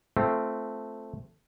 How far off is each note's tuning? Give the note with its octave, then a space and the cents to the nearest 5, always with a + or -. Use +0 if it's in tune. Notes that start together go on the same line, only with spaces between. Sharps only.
A3 +0 C4 +0 F4 -20